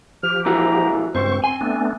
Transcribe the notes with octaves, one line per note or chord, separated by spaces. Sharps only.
F3 G4 F6
A#2 E3 F#4 A#5
C#2 G2 C4 C5 C#6
C4 G#5 C6
A3 B3 D4